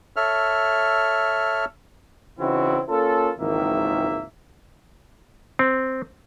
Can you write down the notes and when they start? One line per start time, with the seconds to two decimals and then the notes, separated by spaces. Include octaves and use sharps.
0.16 A4 C#5 E5 F6
2.39 C#3 E3 C4 D#4 E4 F#4
2.89 A#3 C#4 F4 A4
3.38 G#1 C#2 D#3 E3 A#3 E5
5.59 C4